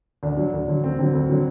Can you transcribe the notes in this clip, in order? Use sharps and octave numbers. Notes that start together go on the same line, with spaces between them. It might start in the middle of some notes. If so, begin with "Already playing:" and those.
D2 D4
D3 F#3
D2
D3 F#3
D2 C4
D3 F#3 C4
D2
D3 F#3